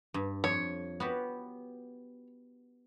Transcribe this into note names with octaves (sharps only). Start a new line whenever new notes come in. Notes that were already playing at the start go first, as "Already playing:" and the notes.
G2
F2 C#5
B3 F#4 G4